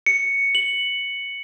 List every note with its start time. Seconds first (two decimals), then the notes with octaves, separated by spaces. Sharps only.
0.06 C#7
0.55 F#7